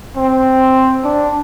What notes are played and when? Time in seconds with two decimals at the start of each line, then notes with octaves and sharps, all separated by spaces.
0.17 C4
1.04 D4